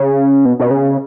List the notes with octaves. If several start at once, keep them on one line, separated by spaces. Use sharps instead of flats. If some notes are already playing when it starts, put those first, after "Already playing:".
Already playing: C#3
B2
B2
C#3